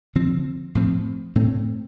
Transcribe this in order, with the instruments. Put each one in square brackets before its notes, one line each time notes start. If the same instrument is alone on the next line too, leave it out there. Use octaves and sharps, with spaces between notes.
[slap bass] D3 F3 C4
A2 F3 C4
A2 A3 C4